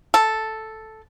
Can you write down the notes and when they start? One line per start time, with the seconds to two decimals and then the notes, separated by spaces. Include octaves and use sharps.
0.14 A4